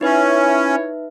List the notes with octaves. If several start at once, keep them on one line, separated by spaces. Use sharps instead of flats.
C#4 D#4 E4 B4 C#5 E5